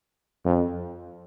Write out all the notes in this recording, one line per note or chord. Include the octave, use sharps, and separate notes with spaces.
F2